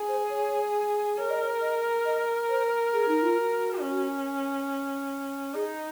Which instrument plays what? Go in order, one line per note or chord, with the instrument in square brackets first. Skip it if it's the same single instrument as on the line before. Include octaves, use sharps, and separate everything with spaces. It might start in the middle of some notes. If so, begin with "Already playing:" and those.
Already playing: [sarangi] G#4
[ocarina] C5
C#5
[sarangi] A#4 [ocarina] C#5
[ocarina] D#5
C#5
D#5
D#5
C5
G#4
D#4
F4
F#4
[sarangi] C#4
[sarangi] D#4 [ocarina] G#4